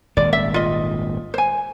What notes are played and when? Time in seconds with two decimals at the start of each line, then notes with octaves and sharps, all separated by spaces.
0.17 D#1 G#1 G#3 D5
0.33 E5
0.54 F4 D#5
1.34 C5 G#5